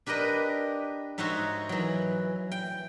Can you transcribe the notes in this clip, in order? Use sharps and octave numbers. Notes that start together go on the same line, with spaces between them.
D4 G4 A#4 B4 D#5
G#2 D#4 F#4 C#5 E5 C6
E3 F#3
G5